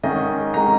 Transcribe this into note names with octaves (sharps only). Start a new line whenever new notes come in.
G#2 D#3 G#3 C#4 D#5
D#3 G#3 C#4 A#5